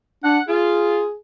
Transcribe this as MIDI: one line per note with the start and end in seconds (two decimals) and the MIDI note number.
0.24 0.39 62
0.24 0.40 78
0.48 1.01 65
0.48 1.15 68